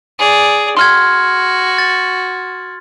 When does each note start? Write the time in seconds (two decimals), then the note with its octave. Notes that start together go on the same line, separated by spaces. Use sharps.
0.19 G#4 D5
0.77 F#4 C6 F6 G#6
1.78 A6